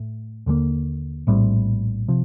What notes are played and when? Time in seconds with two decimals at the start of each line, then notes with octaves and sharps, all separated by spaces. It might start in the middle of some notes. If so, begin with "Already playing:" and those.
Already playing: A2 A3
0.46 D#2 D3 F3 A#3
1.27 A#1 A2 G3 C4
2.08 C3 F3